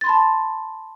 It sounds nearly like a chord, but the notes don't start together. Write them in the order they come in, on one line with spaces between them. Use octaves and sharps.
A6 C6 B5 A5